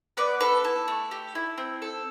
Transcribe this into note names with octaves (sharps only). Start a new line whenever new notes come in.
B3 B4 D5
A4 B4
E4 A4
A3
G4
E4
C4
A4